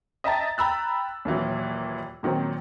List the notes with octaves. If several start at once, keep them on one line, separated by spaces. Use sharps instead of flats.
D#5 E5 G5 A5 A#5 A6
G5 A#5 B5 E6 F#6
D#2 A#2 E3 F#3
A#2 D#3 F#3 C4